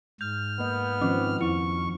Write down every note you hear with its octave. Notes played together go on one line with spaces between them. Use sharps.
G#2 F6 G6
A#3 B3 D#5
D#3 F3 C4 C#4
F2 E4 C#6